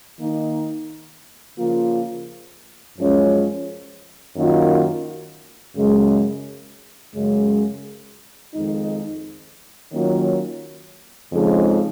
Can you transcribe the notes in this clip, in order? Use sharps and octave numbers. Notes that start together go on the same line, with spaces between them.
D#3 A#3 D#4
C#3 F3 A#3 F4
F#2 F3 G#3 C#4 F4
F#2 D#3 F#3 A#3 F4
F#2 C#3 G#3
F#2 C#3 G#3
F2 D#3 G#3 D#4
D#3 F#3 A#3 C#4 F4
F2 C#3 F3 G#3 D#4